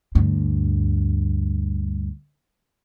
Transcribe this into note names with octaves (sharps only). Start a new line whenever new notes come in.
D2 G2